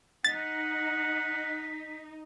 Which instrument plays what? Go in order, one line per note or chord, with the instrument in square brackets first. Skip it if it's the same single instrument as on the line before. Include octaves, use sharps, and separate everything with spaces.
[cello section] D#4 [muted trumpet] F#5 [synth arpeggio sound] A6 [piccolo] B6